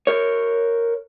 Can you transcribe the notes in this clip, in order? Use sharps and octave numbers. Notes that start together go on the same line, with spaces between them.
A#4 C#5